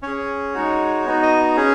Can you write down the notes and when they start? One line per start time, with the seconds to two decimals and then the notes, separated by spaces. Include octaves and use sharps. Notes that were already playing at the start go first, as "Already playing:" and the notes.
0.03 C#4 G#4 C#5
0.54 G#3 D#4 F#4
1.05 B3 D#4 F#4
1.22 D#5
1.57 C#4 G#4